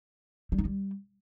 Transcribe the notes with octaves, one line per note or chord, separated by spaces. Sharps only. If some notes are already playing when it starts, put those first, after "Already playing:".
G3
D#4
G3